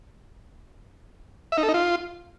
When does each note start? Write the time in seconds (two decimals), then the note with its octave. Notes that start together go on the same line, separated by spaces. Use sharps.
1.52 E5
1.58 D#4
1.63 A4
1.68 D#4
1.74 F4